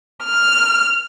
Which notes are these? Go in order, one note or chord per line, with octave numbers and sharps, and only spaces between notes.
F6